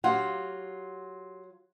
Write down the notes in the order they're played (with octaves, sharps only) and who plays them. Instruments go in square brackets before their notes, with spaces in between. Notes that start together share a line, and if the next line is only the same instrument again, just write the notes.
[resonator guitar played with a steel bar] F#3 F4 [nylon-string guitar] G4 F#5